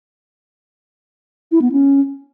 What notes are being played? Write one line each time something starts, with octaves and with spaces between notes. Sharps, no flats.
E4
B3
C#4